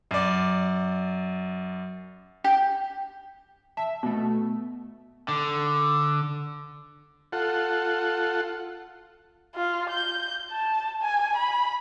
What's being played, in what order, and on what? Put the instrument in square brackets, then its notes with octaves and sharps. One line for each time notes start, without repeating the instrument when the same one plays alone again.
[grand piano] F#2 D5
[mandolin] G4
[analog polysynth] E5 [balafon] A5
[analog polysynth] B2 A3 [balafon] B3
[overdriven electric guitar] D3
[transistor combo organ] F4 A4 F#5
[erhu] F4
G6
A5
G#5
B5